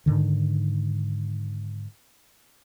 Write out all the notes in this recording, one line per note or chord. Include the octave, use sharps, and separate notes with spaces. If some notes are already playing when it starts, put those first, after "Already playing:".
G#2 B2 D3 D#3